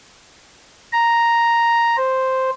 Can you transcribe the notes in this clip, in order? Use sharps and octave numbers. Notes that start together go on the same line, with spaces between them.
A#5
C5